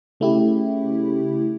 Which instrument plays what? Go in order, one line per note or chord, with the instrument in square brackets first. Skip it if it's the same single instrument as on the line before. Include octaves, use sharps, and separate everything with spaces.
[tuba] C#3 [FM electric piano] A3 E4 G4